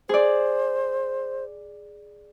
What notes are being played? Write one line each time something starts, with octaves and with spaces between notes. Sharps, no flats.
G#4 C5 D5